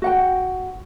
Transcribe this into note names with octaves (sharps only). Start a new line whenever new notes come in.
F#4 F#5 G5